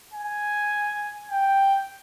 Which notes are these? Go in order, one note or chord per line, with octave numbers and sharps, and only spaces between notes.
G#5
G5